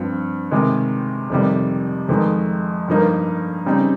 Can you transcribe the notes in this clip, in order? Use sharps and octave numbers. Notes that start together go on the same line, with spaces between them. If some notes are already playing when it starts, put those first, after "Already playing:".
Already playing: G2 F3 C4
C3 D#3 G#3
F2 C3 D#3 G3
F2 D#3 G#3 D#4
G2 F3 A#3 D#4
C#3 G3 C4 D#4